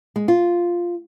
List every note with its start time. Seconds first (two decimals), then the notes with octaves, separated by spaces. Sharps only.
0.16 G#3
0.28 F4